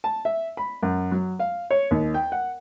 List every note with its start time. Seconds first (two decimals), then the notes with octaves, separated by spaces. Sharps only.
0.04 A5
0.25 E5
0.57 B5
0.83 F#2
1.12 F#3
1.39 F5
1.70 C#5
1.91 D#2
2.14 G5
2.32 F#5